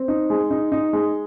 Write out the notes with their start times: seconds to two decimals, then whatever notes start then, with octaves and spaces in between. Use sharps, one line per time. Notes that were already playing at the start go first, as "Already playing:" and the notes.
Already playing: C4
0.08 D#4
0.30 G#3
0.51 D#4
0.72 D#4
0.93 G#3